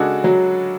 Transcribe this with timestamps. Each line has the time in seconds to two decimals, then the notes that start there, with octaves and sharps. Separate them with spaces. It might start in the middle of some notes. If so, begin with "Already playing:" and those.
Already playing: C#3 G#3 D4 F#4 A4
0.24 F#3